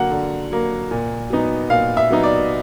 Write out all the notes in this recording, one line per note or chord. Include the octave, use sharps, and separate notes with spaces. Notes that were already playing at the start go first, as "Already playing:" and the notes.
Already playing: D3 F#3 A#3 F#5
D3
F#3 A#3
A#2
F#3 B3 D#4
A#2 F5
E5
F#3 B3 D#4
D5